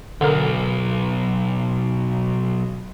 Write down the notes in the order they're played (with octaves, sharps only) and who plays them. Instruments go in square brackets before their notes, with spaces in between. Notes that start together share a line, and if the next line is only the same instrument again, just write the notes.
[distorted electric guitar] B1 [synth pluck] D3 A#4